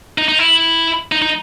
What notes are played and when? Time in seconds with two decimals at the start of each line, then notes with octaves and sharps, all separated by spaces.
0.18 D#4
0.28 D#4
0.39 E4
1.12 D#4
1.22 D#4